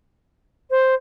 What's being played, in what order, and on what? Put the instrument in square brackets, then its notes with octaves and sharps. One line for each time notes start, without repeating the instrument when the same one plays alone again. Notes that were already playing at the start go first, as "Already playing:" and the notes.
[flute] C5